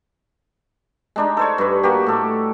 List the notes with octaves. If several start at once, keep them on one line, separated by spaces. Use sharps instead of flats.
G#3 D4 D#4
A4 C5 C#5
G2 B4
A#3 F#4 G4
A2 A4